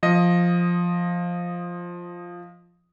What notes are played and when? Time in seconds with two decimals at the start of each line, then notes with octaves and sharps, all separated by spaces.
0.03 F3 D#5